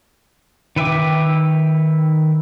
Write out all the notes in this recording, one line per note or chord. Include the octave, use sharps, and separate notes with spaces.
D#3 B4 E5 G5 D6